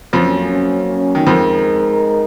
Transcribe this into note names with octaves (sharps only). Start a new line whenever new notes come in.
F2 F3 F#3 A#3 C#4
D#3
F2 F3 G#3 D#4 A#4